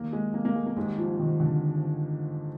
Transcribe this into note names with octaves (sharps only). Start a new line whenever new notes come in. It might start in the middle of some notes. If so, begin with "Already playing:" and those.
Already playing: D#2 D#3 G3 A#3
G#3
A#3
A#3
G#3
A#3
G#1 G#2 G3 G#3
F3
D#3
D3